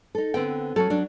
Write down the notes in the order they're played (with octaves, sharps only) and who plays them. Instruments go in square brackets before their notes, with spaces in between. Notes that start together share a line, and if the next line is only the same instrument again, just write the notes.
[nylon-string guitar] D#4 A4
[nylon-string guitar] D3 B3 C4 [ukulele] G5
[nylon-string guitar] F#3 [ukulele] C#4 A4
[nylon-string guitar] F#3 D4